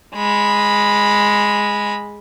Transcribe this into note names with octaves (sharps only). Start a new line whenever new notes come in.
G#3 B5